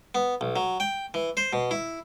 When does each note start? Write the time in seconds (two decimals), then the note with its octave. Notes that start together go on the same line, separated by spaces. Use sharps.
0.15 B3
0.41 B1
0.56 F#3
0.80 G5
1.14 E3
1.37 C5
1.53 B2
1.71 E4